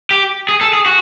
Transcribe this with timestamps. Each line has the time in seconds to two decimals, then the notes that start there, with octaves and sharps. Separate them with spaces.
0.11 G4
0.49 G#4
0.61 A4
0.73 G#4
0.86 F#4